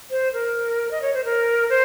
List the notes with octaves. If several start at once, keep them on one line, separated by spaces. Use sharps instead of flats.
C5
A#4
D#5
C#5
C5
A#4
C5